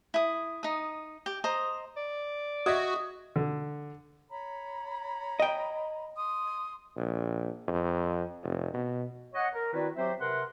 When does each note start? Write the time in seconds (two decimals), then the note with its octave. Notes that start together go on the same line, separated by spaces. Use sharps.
0.14 E4 D#6
0.63 D#4 D#6
1.26 G4
1.44 C5 D#5 A#5 D#6
1.97 D5
2.66 F#4 D#5 E5 D#6 G#6
3.36 D3
4.31 C#5 A#5 B5
5.40 D#5 G5
6.16 C6 D#6
6.96 A#1
7.68 F2
8.43 F1
8.74 B2
9.34 C#5 D#5 F#5
9.53 A#4
9.74 D#3 C4 E4 F#4 B4 D5
9.97 F#3 C4 G4 C5 E5
10.19 C3 A#4 B4 F#5 C6